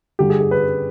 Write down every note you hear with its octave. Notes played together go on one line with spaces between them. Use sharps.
G2 D3 G3 G4
G#4
G#4
B4